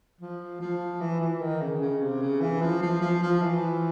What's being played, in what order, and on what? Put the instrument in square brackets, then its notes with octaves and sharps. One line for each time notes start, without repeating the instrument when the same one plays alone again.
[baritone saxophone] F3
F3
E3
E3
D#3
C#3
C#3
C3
C#3
E3
F3
F3
F3
F3
E3